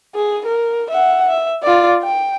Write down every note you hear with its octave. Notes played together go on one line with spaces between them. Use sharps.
G#4
A#4
E5 F#5
E5
F4 D5
G5